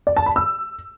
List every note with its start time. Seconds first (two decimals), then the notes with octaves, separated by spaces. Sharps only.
0.07 D5
0.17 A5
0.26 B5
0.36 E6